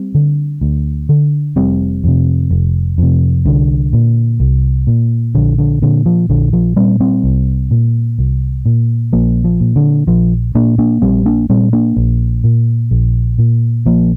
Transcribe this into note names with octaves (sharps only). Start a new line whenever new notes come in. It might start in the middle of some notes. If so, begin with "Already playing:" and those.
Already playing: G3 C4
D3
D2
D3
F1 G3 C4
F2 C3
F1
F2 C3
C2 D3
A#2
C2
A#2
A#1 D3
D3
A#2 D3
F3
A#1 D3
F3
A#2 G3 C4
G3 C4
C2
A#2
C2
A#2
A#1 F3 A#3
F3
A#2
D3
A#1 F3
A#2 A#3 D4
A#3 D4
A#1 G3 C4
A#3 D4
A#2 G3 C4
A#3 D4
A#1
A#2
A#1
A#2
A#1 F3 A#3